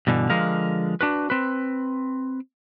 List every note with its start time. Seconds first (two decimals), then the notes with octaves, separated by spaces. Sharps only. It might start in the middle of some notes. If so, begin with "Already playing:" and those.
0.07 G2 B2 D3 E3
0.30 D3 F3 G#3 A#4 F5
1.01 D4 F#4 B4
1.30 C4 B4